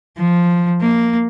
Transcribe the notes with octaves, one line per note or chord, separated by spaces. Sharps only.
F3
A#3